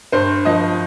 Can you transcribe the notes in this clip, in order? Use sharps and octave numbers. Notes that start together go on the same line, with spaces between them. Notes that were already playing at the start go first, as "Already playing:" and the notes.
G2 C5
F3 D#5